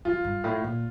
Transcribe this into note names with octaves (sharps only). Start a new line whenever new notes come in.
F2 F4
G2
A2
A#2